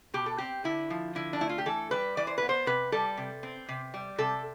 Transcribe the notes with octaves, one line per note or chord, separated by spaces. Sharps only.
B2 G4
A4
C4 G4
D3 E4
F3
D3 E4
D4
A3 E4
F4
G4
E3 A4
G3 B4
E3 D5
C5
B3 B4
C5
C3 B4
G3 A4
C3
C4
C3
G3
C3 A4